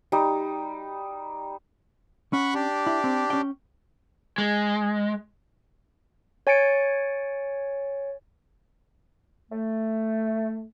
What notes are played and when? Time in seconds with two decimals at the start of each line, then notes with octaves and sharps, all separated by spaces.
0.12 G3 D#4
2.33 C#4 F#5 B5 C#6
2.54 D4 G4
2.87 E4
3.04 C4
3.30 C#4 G5
4.38 G#3
6.47 C#5 G#5 A6 C#7 D7
9.51 A3